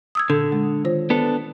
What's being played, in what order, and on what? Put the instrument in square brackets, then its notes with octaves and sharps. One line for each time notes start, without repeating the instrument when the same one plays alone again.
[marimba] D#6 E6 G#6
[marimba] A#2 A4 [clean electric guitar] D3
[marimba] G#3
D#3 F4 C5
[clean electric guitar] B3 D4 A4